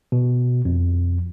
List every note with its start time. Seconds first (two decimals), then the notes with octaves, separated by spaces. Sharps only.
0.12 B2
0.65 F2